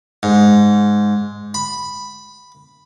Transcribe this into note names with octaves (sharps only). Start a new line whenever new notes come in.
G#2
B5